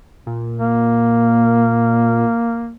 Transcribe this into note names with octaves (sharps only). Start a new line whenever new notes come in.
A#2
A#3